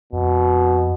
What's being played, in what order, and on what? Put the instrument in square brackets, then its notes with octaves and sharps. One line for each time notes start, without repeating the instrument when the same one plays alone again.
[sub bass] F2 [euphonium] B2